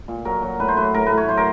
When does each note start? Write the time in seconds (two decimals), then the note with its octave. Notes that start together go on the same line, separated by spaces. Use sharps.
0.08 A#2
0.25 F#3 A#4
0.42 F#3
0.60 A2 B4
0.68 C5
0.77 F#3 B4
0.94 A2 A#4
1.06 B4
1.12 A2
1.17 C#5
1.29 F#3 C5
1.37 A#4